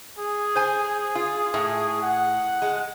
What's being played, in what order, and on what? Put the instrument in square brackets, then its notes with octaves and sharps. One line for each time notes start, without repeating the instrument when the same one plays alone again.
[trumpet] G#4
[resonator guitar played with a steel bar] C5 G#5
F4
A2
[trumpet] F#5
[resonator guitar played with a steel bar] G#3